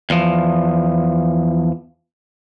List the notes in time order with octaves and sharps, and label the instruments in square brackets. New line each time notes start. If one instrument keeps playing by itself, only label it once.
[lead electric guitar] E2 F3